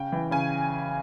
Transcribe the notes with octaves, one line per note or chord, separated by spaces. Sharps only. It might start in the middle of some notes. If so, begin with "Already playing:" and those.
Already playing: C#3 G5
E3
C#3 G#5